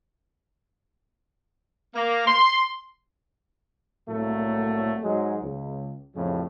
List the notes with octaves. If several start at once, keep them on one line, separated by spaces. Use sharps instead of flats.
A#3
C6
C2 A2 F#3 A3 A#3
G#2 F#3 G#3
C#2
A1 F2 A2 C#3 F3